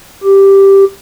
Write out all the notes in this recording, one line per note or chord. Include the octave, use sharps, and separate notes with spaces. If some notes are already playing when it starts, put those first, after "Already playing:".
G4